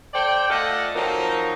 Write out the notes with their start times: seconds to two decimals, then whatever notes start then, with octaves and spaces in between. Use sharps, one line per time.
0.14 A4 C5 D5 G5
0.50 A3 F4 A4 D5 D#5 F#5
0.96 F3 F#3 A#3 C4 D#4